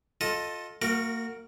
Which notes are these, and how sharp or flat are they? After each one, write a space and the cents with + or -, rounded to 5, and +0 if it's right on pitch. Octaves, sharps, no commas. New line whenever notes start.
F4 +25 A4 +0 D#5 +0
A#3 -35 F#4 -10 A#4 +0